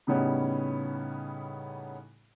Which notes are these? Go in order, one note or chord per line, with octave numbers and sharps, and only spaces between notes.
A2 C#3 G3 B3 C#4 D#4